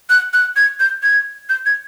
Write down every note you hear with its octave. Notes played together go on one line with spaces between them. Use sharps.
F#6
F#6
G#6
G6
G#6
G6
G#6